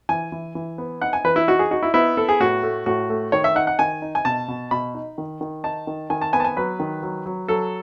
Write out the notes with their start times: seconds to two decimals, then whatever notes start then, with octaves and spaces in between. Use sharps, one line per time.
0.09 E3 G#5
0.32 E3
0.55 E3
0.78 B3
1.01 D#4 F#5
1.13 G#5
1.24 E3 B4
1.36 E4
1.48 D#4 F#4
1.59 G#4
1.71 D#4 F#4
1.83 E4
1.94 B3 E4
2.17 B3 A4
2.29 G#4
2.40 A2 F#4
2.63 A3
2.86 A2 F#4
3.10 A3
3.32 D#3 C#5
3.44 E5
3.55 D#4 F#5
3.67 F#5
3.79 D#3 G#5
4.02 D#4
4.15 G#5
4.25 B2 A5
4.48 B2
4.71 B2 B5
4.94 D#4
5.18 D#3
5.41 D#3
5.64 D#4 A5
5.87 D#3
6.10 D#3 G#5
6.21 A5
6.33 B3 G#5
6.40 A5
6.45 G#5
6.56 F#3 B4
6.80 D#3
7.03 F#3
7.26 F#3
7.48 F#3 A4